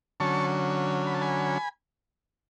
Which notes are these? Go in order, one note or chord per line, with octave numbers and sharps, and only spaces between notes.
D3 F#3 C#4 A5 C#6
B5
A5
G#5 B5